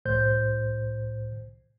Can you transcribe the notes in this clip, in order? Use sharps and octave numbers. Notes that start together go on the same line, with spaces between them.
C2 A2 C5 G6